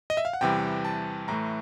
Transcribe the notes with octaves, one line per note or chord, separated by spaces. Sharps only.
D#5
E5
F5
F#5
E2 C3 E3 G3 G5
A5
A2 E3 A3 A#5